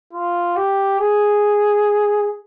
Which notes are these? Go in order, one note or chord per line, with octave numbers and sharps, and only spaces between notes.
F4
G4
G#4